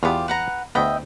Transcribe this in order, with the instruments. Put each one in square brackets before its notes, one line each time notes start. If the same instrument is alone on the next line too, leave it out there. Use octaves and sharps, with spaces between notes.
[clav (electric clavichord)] E2 B3 [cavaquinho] F4 G4
[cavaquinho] B4 F#5 A#5
[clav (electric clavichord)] D2 B3 [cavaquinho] D#5 E5 G5